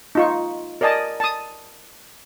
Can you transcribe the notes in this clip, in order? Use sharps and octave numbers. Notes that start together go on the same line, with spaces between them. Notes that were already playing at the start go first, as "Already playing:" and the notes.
D#4 F4 C#6
A#4 D5 D#5 G#5 A5
A5 D#6